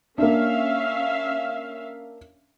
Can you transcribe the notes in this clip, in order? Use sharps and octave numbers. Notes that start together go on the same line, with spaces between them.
A#3 C#4 D4 E5 F5